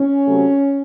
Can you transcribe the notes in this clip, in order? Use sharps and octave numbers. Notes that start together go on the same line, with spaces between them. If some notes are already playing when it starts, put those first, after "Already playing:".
Already playing: C#4
C3 F#3 A3